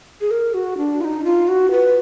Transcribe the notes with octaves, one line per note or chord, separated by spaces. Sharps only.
G#4
A#4
F#4
D4
F4
D#4
F4
F#4
B4